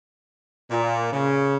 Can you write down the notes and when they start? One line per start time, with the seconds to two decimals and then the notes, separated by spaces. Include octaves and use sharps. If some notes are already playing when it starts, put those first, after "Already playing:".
0.69 A#2
1.12 C#3